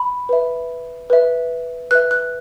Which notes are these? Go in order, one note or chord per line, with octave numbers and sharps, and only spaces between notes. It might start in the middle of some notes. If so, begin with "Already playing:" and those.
Already playing: B5
B4 E5
B4 E5
B4 E5 F#6
F#6